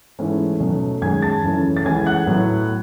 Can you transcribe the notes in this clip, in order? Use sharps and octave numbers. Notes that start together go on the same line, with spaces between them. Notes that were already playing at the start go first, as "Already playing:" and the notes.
G#2 E3 A3 C#4
B2 F#3 A3 C#4
F#2 D#3 G#3 C#4 G#5 G#6
A5 A6
F#2 C#3 E3 A3 C#4
A6
C#2 C#3 E3 A3 C#4 G#5 G#6
F#5 F#6
A2 F#3 B3